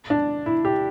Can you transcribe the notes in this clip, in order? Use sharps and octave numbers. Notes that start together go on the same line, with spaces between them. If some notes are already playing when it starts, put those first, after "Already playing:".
D4
E4
G4